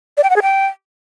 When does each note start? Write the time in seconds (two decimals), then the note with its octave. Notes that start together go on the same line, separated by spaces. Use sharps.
0.17 D5
0.24 G5
0.30 F#5
0.36 G#4
0.42 G5